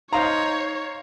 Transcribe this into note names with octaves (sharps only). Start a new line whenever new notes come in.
D#4 C5 C#5 F5 A#5 C6